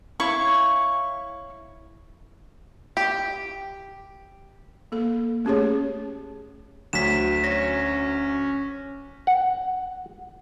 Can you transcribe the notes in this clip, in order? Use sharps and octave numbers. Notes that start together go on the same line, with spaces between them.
E4 C#5 F5 C#6
G4
A#3 A4
A3 C#4 G4 G#4 C#5
D2 F#3 B6 E7
C#4 A#6
F#5